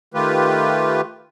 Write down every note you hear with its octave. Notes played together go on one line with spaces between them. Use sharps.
D#3 A3 F4 G4 B4